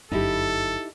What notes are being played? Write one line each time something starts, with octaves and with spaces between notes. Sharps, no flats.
G1 F#2 D#4 E4 G4 A4